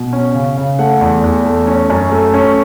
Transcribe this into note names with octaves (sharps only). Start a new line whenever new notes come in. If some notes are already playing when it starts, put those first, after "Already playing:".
Already playing: B2
C#4
C#3
C#3
A3 F#5
E2
E2
A3
C#4
F#2
A3
C#4